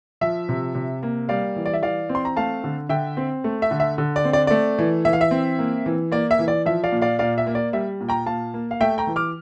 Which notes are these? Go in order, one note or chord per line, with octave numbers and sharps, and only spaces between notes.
F3 E5
C3
C3
A#3
G3 D5 F5
E3
D5
E5
E3 D5 F5
C4
C6
A#5
A3 F5 A5
D3
D3 E5 G5
C4
A3
E5
D3
E5
D3
D5
C4
D5
A3 D5
E3
E3 E5
F5
E5
C4
A#3
E3
A#3 D5
E5
E3
D5
F3 E5
D5 F5
A#2
D5 F5
A#2 D5 F5
E5
A#3
D5
G3 E5
A#2
G5 A#5
A#2 F5 A5
A#3
F5
A3 E5 G5
G5 A#5
E3
D6 F6